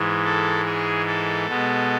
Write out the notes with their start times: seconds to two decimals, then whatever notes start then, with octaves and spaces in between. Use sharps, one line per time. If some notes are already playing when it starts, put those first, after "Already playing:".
Already playing: G#2 E3 G#3
0.24 A4
0.65 G#4
1.06 A4
1.47 B2 G#3 B3